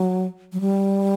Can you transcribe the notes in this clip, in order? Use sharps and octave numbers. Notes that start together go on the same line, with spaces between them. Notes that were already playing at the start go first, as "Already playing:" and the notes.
Already playing: F#3
F#3
G3